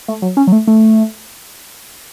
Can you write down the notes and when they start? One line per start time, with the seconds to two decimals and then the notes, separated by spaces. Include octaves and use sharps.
0.08 A3
0.22 F#3
0.37 C#4
0.47 F#3
0.52 A3
0.67 A3